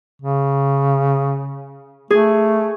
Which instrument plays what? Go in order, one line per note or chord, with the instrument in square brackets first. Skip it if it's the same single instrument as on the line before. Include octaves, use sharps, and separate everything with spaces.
[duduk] C#3
[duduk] A3 [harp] G#4